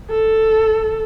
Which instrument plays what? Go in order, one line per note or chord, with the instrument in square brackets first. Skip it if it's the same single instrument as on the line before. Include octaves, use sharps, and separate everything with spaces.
[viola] A4